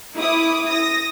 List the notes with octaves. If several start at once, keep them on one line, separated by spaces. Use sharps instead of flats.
E4 D6 D#6
D#6 A#6